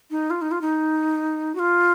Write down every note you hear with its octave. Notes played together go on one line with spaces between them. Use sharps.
D#4
F4
D#4
F4
D#4
F#4
F4